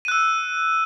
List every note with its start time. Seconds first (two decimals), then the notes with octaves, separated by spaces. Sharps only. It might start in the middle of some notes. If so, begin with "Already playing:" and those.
0.05 D#7
0.08 F#6
0.12 E6